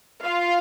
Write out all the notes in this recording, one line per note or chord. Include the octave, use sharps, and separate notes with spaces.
F4 F5